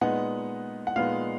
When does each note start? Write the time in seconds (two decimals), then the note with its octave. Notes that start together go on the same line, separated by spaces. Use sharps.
0.01 A#2 G#3 B3 D#4 F#5
0.87 F#5
0.96 A#2 G#3 B3 D#4 F5